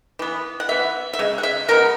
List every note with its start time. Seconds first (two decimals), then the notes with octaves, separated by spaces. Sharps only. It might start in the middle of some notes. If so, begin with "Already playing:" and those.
0.19 E3 B3
0.60 F#5
0.69 E3 B3 E5
1.13 E5
1.19 C#3 G#3
1.38 F#5
1.43 E5
1.69 C#3 G#3 B3 A#4